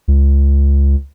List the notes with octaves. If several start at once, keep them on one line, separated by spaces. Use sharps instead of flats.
C#2